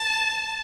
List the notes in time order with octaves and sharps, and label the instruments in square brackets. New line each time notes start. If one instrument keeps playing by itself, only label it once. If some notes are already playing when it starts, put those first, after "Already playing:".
Already playing: [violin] A5